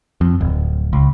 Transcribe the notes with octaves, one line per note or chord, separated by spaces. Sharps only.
F2
D1
C#2